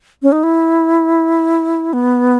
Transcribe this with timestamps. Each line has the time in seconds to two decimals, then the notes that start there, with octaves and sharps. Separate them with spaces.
0.23 C#4
0.32 D#4
0.43 E4
1.93 B3